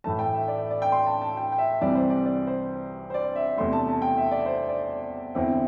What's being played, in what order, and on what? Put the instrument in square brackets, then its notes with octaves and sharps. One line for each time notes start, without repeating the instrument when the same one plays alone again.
[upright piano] A2 E3 A3 A5
G5
E5
D5
D5
G5
C6
A5
A5
G5
G5
E5
C2 C3 E3 D5
C5
D5
D5
C5
C5
D5
E5
E2 C3 A3 C6
A5
A5
G5
E5
D5
C5
D5
E2 D3 C4 E4